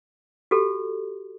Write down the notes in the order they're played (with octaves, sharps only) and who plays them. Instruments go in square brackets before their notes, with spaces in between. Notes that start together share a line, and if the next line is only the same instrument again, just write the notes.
[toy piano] F#4 G4 A4